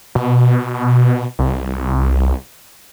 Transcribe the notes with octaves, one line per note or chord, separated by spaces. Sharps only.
B2
C2